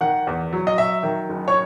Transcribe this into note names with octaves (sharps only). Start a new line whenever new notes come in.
D#3 F#5
E2
F#3
D#5
F#3 E5
D#3
F#1
C#5